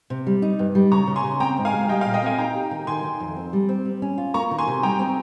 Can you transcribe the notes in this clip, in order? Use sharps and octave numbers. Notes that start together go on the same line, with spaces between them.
C3
G3
D#4
G2
G3
C#3 A#5 C#6
C#3
G#5 C6
C#3
C4 G5 A#5
G#2
F5 G#5
G#3
G3 D#5 G5
F5
A#2
D#5 G5
C4 F5 G#5
D#4 G5 A#5
G4
D#3
D#3 G#5 C6
D#3
F2
C4
G3
C4
G3
C#4
F4
A#3 A#5 C#6
D#3
G#5 C6
C3
G3 G5 A#5
C4